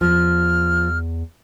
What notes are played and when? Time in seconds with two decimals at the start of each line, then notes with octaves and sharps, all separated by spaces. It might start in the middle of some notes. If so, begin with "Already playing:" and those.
0.01 E2 F3 F6